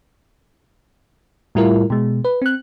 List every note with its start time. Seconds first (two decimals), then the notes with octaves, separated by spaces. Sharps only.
1.55 A2 G3 E4 F4 A#4
1.90 B2 G#3
2.25 B4
2.42 C4 F#6